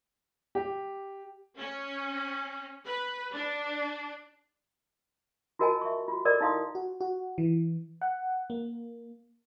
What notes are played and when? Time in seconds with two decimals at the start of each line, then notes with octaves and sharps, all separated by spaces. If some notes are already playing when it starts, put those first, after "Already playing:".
0.55 G4
1.57 C#4
2.86 B4
3.35 D4
5.59 F4 F#4 A#4 D#5 G#5 A5
5.81 E5 C#6
6.08 F4 F#4
6.25 A4 A#4 D5 D#5
6.41 D#4 E4 F5 C6 D#6
6.75 F#4
7.01 F#4
7.38 E3
8.02 F#5
8.50 A#3